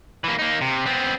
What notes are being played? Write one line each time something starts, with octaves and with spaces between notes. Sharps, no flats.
E3 A#3
A#3 D#4
C3
B3 C4